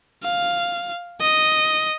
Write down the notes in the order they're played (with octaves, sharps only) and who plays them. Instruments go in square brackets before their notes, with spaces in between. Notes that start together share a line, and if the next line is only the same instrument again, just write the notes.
[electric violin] F5
D#5